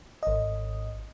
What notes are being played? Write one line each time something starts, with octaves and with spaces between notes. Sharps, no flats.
G#1 D#5